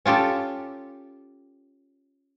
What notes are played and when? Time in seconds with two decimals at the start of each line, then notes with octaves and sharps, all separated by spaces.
0.06 C#4 F4 G4 A4